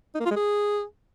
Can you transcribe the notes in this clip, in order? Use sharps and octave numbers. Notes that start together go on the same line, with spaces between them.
D#4
A#3
F4
G#3
G#4